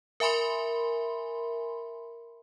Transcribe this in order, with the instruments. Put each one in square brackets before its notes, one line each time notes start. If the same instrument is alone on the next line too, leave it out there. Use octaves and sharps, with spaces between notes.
[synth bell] A#4 E5 G#5 B5 C6